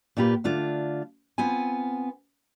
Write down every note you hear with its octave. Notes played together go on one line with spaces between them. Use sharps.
A#2 A#3 F4 G4 B4
D3 A3 D4 F4
B3 C4 F4 G#5